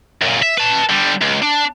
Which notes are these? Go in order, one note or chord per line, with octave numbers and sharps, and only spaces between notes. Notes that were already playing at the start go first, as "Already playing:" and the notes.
F#2 A#2
E5
B4 A5
D3 G3
C#2
D4